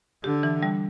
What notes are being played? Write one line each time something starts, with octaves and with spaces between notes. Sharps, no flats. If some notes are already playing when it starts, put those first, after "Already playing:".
D3 G4
E3
G3